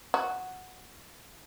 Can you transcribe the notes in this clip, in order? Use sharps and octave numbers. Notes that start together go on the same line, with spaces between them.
F#4